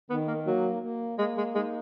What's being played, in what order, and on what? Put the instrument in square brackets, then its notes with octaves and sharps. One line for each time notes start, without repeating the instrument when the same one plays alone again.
[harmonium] D#3 [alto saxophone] B3
[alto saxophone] A#3
[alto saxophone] F#3 [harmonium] A#3
[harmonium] A#3
[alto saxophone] G#3 [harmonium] A#3
[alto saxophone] G#3
[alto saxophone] G#3 [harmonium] D#4